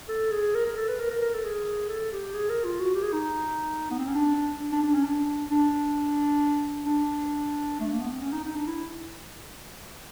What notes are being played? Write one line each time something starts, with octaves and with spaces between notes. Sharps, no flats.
A4
G#4
A#4
A#4
A4
B4
A#4
A#4
A#4
A4
G#4
A4
G4
G#4
A#4
F4
F#4
G4
G#4
D#4
B3
C4
C#4
D4
D4
D4
C#4
D4
D4
D4
A3
A#3
B3
C4
C#4
D#4
D#4
D4
E4